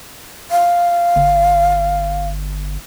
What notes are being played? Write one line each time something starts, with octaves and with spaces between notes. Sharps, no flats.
F5
G1